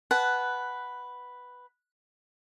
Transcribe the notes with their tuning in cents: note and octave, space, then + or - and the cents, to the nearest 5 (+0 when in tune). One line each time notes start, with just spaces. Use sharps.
B4 +0 F#5 +10 A5 -30